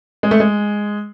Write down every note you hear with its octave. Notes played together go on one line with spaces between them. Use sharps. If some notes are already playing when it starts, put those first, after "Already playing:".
G#3
A3
G#3